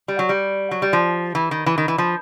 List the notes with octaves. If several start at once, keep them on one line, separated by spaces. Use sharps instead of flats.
G3
F#3
G3
F#3
G3
F3
E3
D#3
E3
D#3
E3
F3